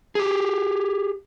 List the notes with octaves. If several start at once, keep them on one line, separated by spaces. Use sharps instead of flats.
G4 G#4